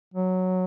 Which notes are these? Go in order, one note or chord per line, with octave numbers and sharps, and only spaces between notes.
F#3